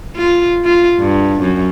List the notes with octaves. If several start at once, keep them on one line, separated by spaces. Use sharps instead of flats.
F4
F4
G2
F#2